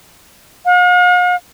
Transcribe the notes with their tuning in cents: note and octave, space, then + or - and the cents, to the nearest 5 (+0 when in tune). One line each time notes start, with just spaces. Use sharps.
F5 +45